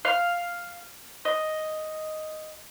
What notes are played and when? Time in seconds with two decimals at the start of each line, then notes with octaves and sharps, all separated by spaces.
0.05 F5
1.25 D#5